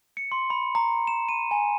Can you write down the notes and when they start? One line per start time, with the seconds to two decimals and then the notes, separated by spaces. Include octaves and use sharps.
0.17 C#7
0.32 C6
0.50 B5
0.75 A#5
1.07 E7
1.29 D#7
1.51 G#5